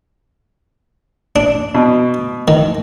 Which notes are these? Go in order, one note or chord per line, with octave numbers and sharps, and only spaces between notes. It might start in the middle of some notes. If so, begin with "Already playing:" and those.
D4
B2
D#3